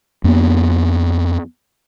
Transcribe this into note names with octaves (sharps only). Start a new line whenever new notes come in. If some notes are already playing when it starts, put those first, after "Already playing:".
F2 A#3 B3 D4